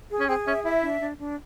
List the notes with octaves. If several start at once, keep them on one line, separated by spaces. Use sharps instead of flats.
G#4
C#4
C4 G#4
C#4 E5
E4 E5
D4
D4
D4